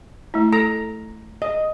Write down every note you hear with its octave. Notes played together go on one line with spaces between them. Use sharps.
A3 E4
A4 A#5
D#5